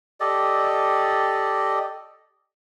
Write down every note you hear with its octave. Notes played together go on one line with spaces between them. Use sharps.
G4 A4 D5 D#5